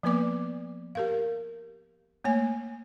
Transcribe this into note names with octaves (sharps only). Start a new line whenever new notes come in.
F3 A#3 B3 B4 D5 D6
G4 A#4 F5
A3 A#3 C#5 G#5